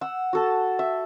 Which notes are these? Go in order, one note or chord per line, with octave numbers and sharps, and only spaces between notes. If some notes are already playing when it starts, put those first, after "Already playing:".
F#5 E6
F#4 A4 A5
E5